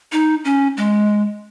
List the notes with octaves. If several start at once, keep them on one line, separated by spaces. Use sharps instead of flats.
D#4
C#4
G#3